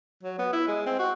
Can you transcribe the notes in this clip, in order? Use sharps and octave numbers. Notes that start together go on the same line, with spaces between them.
F#3
B3
E4
G#3
C4
F#4